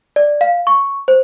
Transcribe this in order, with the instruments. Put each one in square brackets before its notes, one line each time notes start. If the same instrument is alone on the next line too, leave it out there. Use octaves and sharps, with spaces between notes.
[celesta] D5
F5
C#6
C5